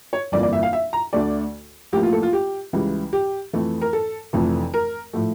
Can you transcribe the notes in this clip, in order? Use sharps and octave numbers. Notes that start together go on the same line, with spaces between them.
C#5
G1 F2 E3 A#3 D5
D5
E5
F5
E5
A#5
D2 D3 A3 D5
A1 A2 F3 A#3 G4
F4
A4
F4
G4
C#2 C#3 E3 G3
G4
F2 E3 A3
A#4
A4
F1 F2 E3 A3
A#4
A2 F3 A3